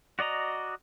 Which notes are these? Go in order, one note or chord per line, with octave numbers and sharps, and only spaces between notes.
F#4 D5 D#5 A#5